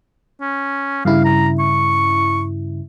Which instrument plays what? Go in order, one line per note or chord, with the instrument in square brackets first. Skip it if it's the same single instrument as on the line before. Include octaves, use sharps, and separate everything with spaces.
[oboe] C#4
[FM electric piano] G2 C#3 E4 [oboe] F5
[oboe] A#5
C#6